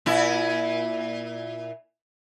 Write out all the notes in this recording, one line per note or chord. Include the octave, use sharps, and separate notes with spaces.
A#2 E4